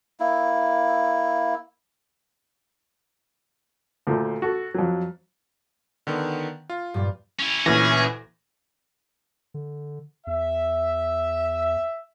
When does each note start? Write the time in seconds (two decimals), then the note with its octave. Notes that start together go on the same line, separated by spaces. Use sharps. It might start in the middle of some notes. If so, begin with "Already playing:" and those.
0.20 A#3 E4
4.07 D2 A#2 A3
4.42 F#4 A4
4.74 F2 F#3
6.07 D3 D#3 B3
6.70 F4
6.94 G2 A#2 G3
7.39 C#4 E4
7.66 D2 A#2 E3 C#4 G#4 A#6
9.54 D3
10.27 E2 E5